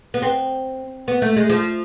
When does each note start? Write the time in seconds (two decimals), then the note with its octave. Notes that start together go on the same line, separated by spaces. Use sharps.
0.14 B3
0.22 C4
1.08 B3
1.22 A3
1.36 G#3
1.49 F3